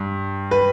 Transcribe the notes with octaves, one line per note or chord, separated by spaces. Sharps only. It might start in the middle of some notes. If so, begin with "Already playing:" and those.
Already playing: G2
B4